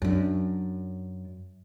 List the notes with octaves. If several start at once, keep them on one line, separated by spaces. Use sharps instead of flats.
F#2 D4